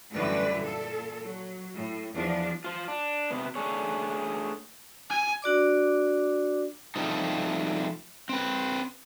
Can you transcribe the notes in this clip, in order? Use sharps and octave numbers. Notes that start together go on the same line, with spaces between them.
F#2 A2 D3 E3 G3 B4
A#2 A4
F#3
A2
E2 F3 D4
F4 C5
D4
C3 B3
A3 D4 G#4 C#5
G#5
D4 F#4 D5 D6
F3 G3 A3 C4 D#4
C4 B4